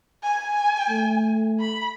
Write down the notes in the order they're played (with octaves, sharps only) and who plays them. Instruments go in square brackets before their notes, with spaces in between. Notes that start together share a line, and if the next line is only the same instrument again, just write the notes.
[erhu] G#5
[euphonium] A3
[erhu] B5